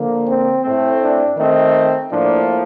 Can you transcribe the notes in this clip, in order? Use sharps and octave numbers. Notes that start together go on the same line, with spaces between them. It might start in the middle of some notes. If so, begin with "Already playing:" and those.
Already playing: D3 F3 A#3
C4
A2 A3 C4
D4
D#3 A3 C4 D#4
A2 F3 A#3 D4